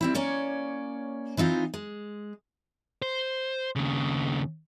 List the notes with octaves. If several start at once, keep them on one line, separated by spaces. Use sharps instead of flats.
G3 C4 E4
A#3 C#4 C#5 D5
E3 C4 D#4 F4
G#3
C5
D#2 C#3